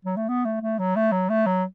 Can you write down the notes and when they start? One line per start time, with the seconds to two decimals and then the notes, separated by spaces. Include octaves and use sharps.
0.05 F#3
0.16 A3
0.29 B3
0.45 A3
0.62 A3
0.79 F#3
0.96 A3
1.12 F#3
1.29 A3
1.46 F#3